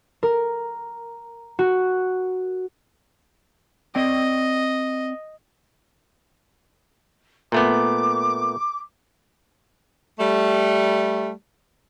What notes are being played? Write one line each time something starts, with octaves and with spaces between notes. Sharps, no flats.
A#4
F#4
C4 D5 D#5 G5
A#2 A3 B3 D6
G3 A3